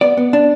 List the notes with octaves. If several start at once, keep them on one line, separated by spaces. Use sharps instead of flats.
B3 D5
B3
D4